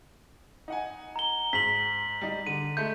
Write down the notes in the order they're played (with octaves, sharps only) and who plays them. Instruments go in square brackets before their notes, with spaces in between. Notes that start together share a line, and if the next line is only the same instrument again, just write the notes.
[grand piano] D#4 F#5 G#5
[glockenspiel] A#5 G7
[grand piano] G#2 [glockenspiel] B6 F#7
[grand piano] G3 D#4
[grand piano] D3 [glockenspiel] D#7
[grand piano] G#3 A3 [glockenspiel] G6